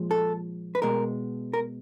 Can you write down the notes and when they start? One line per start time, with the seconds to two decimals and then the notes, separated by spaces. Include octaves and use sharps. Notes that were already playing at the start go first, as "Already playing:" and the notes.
Already playing: A#2 F3 G#3
0.11 A4
0.75 B4
0.82 B2 G#3 A#4
1.54 A#4